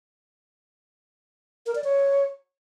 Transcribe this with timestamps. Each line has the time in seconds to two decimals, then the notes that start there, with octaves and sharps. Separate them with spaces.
1.66 A#4
1.75 D5
1.84 C#5